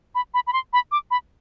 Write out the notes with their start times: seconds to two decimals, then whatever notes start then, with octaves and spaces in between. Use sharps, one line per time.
0.15 B5
0.34 B5
0.47 B5
0.53 C6
0.73 B5
0.92 D6
1.11 B5